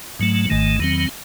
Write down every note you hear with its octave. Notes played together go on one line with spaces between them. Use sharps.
G#2 F#3 A3
G#1 G#2 D#3 A3
E2 D#3 F#3 C4